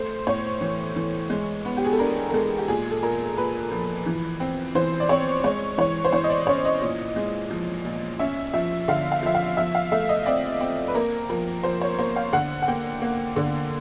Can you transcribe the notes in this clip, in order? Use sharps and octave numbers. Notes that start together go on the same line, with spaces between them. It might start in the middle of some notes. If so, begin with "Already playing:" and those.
Already playing: A3 C5
A2 C#5
E3
E3
G#3
B3
G4
G#4
A4
D4 A#4
A#4
G#3 A4
G4
A#2 G#4
A4
A#2 A#4
A#2 B4
F3
E3
C4
E3 C5
D5
C4 C#5
G#3 C#5
E3 C#5
C5
E3 C#5
D#5
D5
C#4 C#5
D#5
A#2
G#3
F3
A#2
C#4 E5
F3 E5
D3 F5
F5
F3 E5
F5
F3 E5
F5
A3 E5
D#5
C4 D5
C4
B4
A#3 A#4
F3 A#4
F3 C5
C#5
A#3 C5
F5
D3 F#5
F#5
A#3 G5
A#3
D3